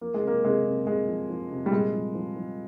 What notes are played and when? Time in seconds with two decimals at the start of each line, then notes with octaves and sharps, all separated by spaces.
0.01 F3 A#3
0.14 G#3
0.23 C3 A#3
0.44 C3 G#3
0.65 C3
0.87 C3 G#3
1.08 F3
1.29 F3
1.51 C3
1.66 G3
1.72 A#2 G#3
1.93 F3
2.15 F3
2.36 F3